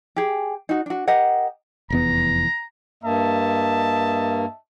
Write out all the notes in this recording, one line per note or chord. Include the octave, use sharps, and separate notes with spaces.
G4 G#4
D#4 F#4
D4 F#4
G4 A#4 D#5 F#5
F1 E2 B3 A#5
G2 A#3 D#5 E5 A5